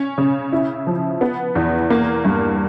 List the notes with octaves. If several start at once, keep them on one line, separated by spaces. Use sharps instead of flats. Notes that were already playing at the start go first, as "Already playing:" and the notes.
Already playing: C#4
C#3
E4
F3
B3
E2
A#3
G2